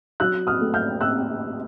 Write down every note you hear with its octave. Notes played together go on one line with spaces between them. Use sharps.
F#3 E6 F#6
D#6 F6
A3
F6 G6
E6 F#6